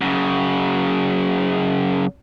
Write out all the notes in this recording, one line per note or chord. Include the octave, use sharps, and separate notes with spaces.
F#2 C#3